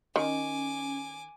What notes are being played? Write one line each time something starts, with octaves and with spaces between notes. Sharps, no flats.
D#3 C#4 G#5 D6